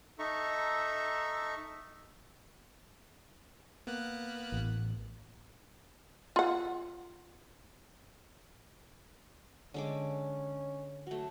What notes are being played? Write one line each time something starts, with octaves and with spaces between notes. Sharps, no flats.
D#4 A4 E5 A#5 C#6
A#3 B3 F#6
A1
F4 F#5
D3 G#3 C#4 D6
F#3 A3 F#4